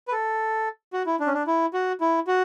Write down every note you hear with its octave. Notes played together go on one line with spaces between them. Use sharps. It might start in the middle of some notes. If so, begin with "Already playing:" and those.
B4
A4
F#4
E4
D4
C#4
D4
E4
F#4
E4
F#4